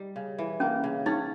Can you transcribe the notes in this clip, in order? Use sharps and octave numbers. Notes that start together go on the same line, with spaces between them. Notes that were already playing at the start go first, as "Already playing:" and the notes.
Already playing: G3 D#4
C#3
E3
A#3 C#4
C#3
C#4 D#4